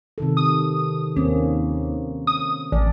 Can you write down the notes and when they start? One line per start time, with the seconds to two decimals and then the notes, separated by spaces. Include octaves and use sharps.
0.18 C3 D#3 A4
0.37 D#6
1.16 D#2 A#3 C4 C#4
2.27 D#6
2.72 A1 D5